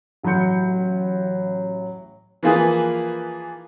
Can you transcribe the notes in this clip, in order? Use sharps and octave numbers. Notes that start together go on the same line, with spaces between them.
A1 F#3 B5 C6 G6 C#7
E3 F3 A#3 F4 G#4 B4